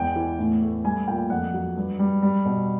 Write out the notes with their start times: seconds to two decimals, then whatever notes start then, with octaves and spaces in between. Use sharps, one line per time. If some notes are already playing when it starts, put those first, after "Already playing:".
Already playing: E2 G#3 G5
0.16 E3
0.38 A2
0.61 A3
0.84 G3 G#5
1.08 A#2 G5
1.30 F2 F#5
1.54 F#3
1.76 G2
1.99 G3
2.22 G3
2.45 B2